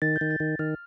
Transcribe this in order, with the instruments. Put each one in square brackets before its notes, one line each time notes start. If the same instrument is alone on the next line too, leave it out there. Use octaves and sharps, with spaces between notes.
[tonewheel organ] D#3 [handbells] A6
[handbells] G6
[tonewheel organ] D#3
[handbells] A6
[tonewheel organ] D#3
[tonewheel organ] D#3 [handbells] F6